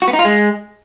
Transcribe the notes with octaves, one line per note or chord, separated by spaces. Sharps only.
F#4
B3
D#4
F4
G#3